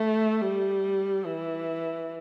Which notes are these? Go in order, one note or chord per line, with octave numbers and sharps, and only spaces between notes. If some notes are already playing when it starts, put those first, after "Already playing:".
Already playing: A3
G3
E3